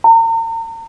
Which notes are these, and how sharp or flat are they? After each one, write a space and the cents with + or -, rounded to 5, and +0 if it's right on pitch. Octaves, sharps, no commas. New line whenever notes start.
A#5 -40